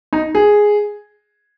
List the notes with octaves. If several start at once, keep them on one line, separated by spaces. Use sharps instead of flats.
D#4
G#4